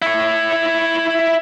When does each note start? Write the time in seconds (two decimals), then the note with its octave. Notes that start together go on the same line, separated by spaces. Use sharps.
0.02 E4 C#5